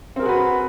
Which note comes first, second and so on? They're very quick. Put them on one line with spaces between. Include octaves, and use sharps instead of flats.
C4 A#4 G#4 F#4 B4